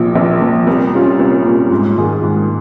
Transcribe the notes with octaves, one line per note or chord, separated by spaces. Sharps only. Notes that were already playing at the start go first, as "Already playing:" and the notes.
Already playing: A#1 A#2 F3
A#1
A#2 F3
C2
A#2 G3 C#4 F4
C2
A#2 G3 C#4 F4
G#2
D#3 A#3 F4 G#4
G#2